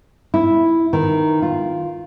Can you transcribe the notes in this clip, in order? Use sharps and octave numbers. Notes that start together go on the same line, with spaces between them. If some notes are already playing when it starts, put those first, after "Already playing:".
E4
D#3
F4